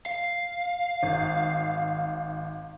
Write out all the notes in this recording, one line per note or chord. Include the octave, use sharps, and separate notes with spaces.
F5
G#1